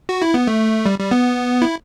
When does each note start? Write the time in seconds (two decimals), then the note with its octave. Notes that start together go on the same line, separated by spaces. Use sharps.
0.09 F#4
0.22 E4
0.34 B3
0.47 A3
0.86 G3
0.99 G3
1.11 B3
1.62 E4